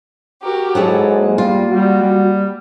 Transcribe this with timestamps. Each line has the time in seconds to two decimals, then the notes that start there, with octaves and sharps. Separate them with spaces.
0.42 F#4 G4 A#4
0.75 G#2 F#3 E4 G#4 A4
1.04 A#3
1.38 G3 F4
1.70 G3 F#4
2.02 G3